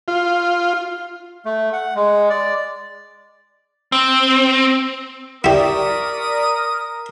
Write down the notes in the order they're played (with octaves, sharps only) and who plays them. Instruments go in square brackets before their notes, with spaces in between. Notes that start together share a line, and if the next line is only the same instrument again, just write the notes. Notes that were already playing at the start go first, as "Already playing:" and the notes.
[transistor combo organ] F4
[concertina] A3
F#5
G#3
D5
[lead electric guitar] C4
[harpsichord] E4 G4 [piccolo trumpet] A#4 [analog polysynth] D5 C#6 B6 [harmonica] D#6